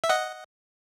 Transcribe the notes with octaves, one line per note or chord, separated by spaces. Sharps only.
E5
D#5 F#5